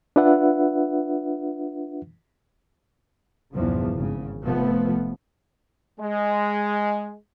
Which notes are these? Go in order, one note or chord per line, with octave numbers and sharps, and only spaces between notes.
D4 F4 B4 E5 F#5
B1 E2 G2 C#3 F3
G#1 C#3
F1 F3 A3 B3
G#3